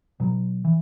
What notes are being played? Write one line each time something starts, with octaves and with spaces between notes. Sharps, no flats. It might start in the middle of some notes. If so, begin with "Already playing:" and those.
B2 F#3
E3